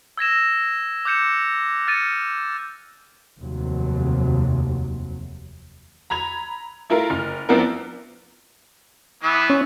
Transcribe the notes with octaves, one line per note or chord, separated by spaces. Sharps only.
E6 G#6 A#6 E7
D6 F#6 G6 C#7 E7
F6 A6 C#7 D#7
F1 D#2 C3 F#3
A#5 B5 G#6 F7
A3 E4 F4 A#4
F#1 F6
F3 B3 C4 D4 E4 A#4
E3 B3 E5
C#4